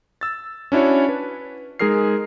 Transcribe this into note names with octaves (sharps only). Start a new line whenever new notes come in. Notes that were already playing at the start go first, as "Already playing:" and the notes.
E6 A6
C#4 D4 E4 F#4 C#5
B4
G#3 D#4 G#4 A#4 F6 C7